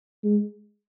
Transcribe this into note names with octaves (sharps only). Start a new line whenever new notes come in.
G#3